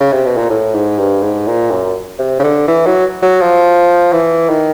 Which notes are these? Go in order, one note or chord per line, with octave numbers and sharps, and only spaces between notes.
C#3
C3
B2
A#2
A2
G#2
G2
G#2
A#2
F#2
C3
C#3
D3
E3
F#3
F#3
F3
E3
D#3